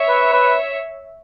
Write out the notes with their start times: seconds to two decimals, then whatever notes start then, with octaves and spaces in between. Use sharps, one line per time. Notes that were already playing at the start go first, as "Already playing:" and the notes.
Already playing: C#5 E5
0.08 B4
0.33 B4